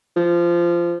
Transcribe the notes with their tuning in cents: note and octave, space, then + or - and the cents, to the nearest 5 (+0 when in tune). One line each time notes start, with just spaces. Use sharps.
F3 -20